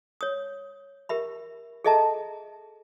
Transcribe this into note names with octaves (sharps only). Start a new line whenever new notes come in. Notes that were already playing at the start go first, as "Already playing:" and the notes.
C#5 D#6
G4 A#4 E5 B5
G#4 A4 D#5 E5 A5 A#5